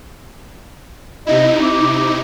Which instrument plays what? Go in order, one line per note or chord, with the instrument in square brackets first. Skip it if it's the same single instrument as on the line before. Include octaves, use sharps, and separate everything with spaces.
[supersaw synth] C3 D#4 E4 [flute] D#5
[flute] D6